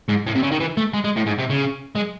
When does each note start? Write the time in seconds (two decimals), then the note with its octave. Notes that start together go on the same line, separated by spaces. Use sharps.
0.09 G#2
0.26 A2
0.35 C3
0.43 C#3
0.51 D#3
0.60 E3
0.77 A3
0.94 G#3
1.05 G#3
1.17 A2
1.27 G#2
1.39 C3
1.50 C#3
1.96 G#3